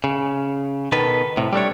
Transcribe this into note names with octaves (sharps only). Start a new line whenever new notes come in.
C#3
B2 D#3 B3 A4 B4
A2 C3
G3 A3 D4 C#5